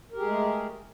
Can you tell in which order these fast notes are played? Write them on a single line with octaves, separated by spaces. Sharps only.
A#4 G4 G#4 G#3 A3